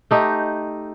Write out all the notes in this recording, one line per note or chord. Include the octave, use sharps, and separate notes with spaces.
A3 D#4 G4